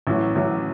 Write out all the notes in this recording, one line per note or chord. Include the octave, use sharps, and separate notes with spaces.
A1 A2 F#3
A1 A2 F#3